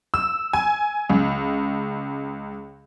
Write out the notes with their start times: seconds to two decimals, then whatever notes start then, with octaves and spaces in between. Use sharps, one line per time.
0.14 E6
0.53 G#5
1.10 C#2